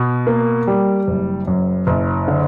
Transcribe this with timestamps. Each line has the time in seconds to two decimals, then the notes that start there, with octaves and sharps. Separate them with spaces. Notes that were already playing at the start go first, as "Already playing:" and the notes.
Already playing: B2
0.27 A#3
0.67 G3
1.07 F#1
1.47 F#2
1.87 F#1
2.28 D3